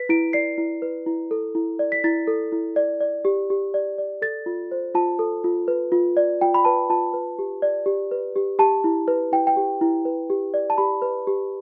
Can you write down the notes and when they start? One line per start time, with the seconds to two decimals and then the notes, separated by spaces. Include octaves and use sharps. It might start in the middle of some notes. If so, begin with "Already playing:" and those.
Already playing: B4 B6
0.09 E4 D7
0.33 D5 C7
0.58 E4
0.82 B4
1.06 E4
1.31 A4
1.55 E4
1.79 D5
1.92 B6
2.04 E4 A6
2.27 A4
2.52 E4
2.76 D5
3.00 D5
3.25 G4
3.50 G4
3.74 D5
3.98 D5
4.22 A4 A6
4.46 F4
4.71 C5
4.95 F4 A5
5.19 A4
5.44 F4
5.68 B4
5.92 F4
6.17 D5
6.41 F4 G5
6.54 B5
6.65 B4 A5
6.90 F4 A5
7.14 B4
7.39 G4
7.62 D5
7.86 G4
8.11 B4
8.36 G4
8.59 G4 A5
8.84 E4
9.08 B4
9.32 E4 G5
9.47 G5
9.57 G4
9.81 E4
10.05 B4
10.30 G4
10.54 D5
10.70 A5
10.78 G4 B5
11.02 B4
11.27 G4